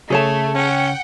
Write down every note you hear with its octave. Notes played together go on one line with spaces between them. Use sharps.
C#3 A3 G#4 C#5 A5
C#4 F#5 G5